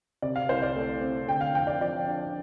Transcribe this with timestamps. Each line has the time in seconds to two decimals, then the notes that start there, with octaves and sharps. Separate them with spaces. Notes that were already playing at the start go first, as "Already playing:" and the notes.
0.22 C3 D5
0.36 F5
0.49 C2 C5
0.62 D5
0.76 A3
1.02 C4
1.28 D3 G5
1.41 F5
1.54 F2 G5
1.67 D5
1.81 F3 D5
2.08 D4